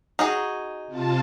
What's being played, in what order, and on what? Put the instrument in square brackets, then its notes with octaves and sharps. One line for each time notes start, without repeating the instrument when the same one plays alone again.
[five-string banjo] D#4 F#4 G#4
[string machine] C3 F4 A5